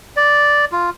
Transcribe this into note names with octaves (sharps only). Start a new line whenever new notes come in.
D5
F4